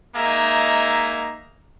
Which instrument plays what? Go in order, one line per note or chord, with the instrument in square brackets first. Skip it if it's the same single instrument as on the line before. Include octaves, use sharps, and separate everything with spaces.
[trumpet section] G#3 A#3 D#4 E5 G#5 A#5